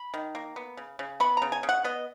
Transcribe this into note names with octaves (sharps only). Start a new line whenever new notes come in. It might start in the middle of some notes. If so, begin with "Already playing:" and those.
Already playing: B5
D#3
A#3
B3
C#3
C#3
B3 B5
C#3 A#5
G#5
C#3
F#5
B3 D#5